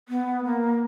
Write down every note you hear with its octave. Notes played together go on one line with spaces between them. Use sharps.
B3
A#3